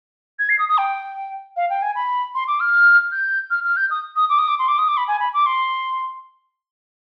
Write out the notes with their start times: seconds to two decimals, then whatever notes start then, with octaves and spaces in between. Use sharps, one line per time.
0.39 G#6
0.49 C7
0.59 D#6
0.69 D#6
0.78 G5
1.56 F5
1.70 G5
1.82 G#5
1.95 B5
2.35 C6
2.48 D6
2.60 F6
3.12 G6
3.50 F6
3.64 F6
3.77 G6
3.91 D#6
4.16 D#6
4.29 D6
4.38 D#6
4.48 D6
4.59 C6
4.68 D6
4.78 D#6
4.88 D6
4.97 B5
5.08 G#5
5.20 B5
5.34 D6
5.46 C6